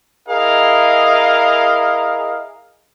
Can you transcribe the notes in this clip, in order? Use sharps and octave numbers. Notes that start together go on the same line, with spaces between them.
E4 G#4 A#4 D#5 F5